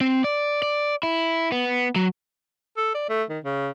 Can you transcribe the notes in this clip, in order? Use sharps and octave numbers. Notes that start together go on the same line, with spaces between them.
C4
D5
D5
E4
B3
F#3
A4
D5
A3
D#3
C#3